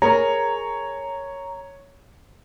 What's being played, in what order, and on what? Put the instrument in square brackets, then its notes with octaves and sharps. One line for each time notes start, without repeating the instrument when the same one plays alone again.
[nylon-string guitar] G#4 A#4 [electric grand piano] C#5 [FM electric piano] A#5